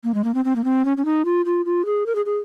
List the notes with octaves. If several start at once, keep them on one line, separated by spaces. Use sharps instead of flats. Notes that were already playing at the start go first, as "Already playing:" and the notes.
A#3
G#3
A#3
C4
C4
A#3
C4
C#4
C#4
D#4
F4
F4
F4
G#4
A#4
G#4
G#4